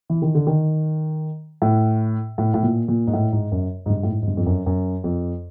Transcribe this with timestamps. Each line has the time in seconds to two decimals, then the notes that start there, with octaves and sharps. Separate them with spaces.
0.10 E3
0.22 D#3
0.35 D3
0.47 D#3
1.62 A2
2.38 A2
2.54 A2
2.63 A#2
2.88 A#2
3.07 G#2
3.14 A2
3.33 G#2
3.52 F#2
3.86 G#2
3.90 G2
4.03 A2
4.08 G#2
4.23 G#2
4.27 G2
4.37 F2
4.46 F#2
4.66 F#2
5.04 F2